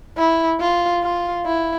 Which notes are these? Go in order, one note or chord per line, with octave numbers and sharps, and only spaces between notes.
E4
F4
F4
E4